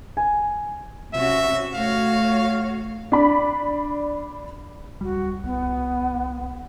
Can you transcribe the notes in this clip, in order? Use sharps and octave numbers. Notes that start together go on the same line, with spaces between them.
G#5
C3 C#4 F#4 E5
A3 F#4 C#5 F5
D4 D5 B5
D1 G3 F#4
C2 B3